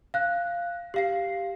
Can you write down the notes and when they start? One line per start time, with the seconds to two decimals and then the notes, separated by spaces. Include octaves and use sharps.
0.14 F5 F#6
0.94 G4 F5 C7